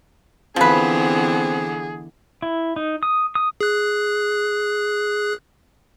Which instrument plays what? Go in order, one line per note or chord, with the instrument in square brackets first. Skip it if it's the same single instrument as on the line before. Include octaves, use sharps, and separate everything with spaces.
[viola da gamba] D3 E3 B3 [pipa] F3 B4 [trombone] C4 [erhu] G#4
[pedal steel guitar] E4
D#4
D#6
D#6
[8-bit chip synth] G#4 F#6